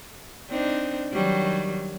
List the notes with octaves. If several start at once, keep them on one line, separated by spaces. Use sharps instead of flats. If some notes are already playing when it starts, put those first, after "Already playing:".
C4 D4 D#4
D#3 F#3 G3